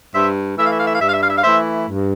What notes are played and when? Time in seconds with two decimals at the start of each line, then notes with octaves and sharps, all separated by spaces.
0.14 G2 C5 E5
0.58 E3 A3 E4 E5
0.65 F5
0.72 E5
0.78 F5
0.86 E5
0.93 F5
1.00 G2 E5
1.07 F5
1.14 E5
1.21 F5
1.29 E5
1.36 F5
1.43 E3 A3 E4 C5 E5
1.88 G2